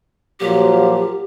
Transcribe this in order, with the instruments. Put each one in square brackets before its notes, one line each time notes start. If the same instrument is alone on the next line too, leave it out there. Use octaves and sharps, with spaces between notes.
[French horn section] A#2 F3 F#3 [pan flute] G4